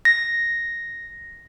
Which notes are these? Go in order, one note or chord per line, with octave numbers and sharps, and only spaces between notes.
A#6